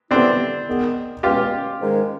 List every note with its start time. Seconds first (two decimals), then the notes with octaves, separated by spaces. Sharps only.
0.11 E3 G3 B3 C4 D4 E4 A4
0.67 D#3 G#3 B3
1.23 C#2 B2 G#3 C#4 F4 G4
1.80 G#2 D#3 G#3 C#4